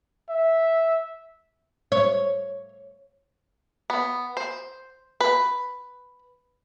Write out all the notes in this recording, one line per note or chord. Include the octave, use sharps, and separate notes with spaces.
E5
C#5
B3
C5
B4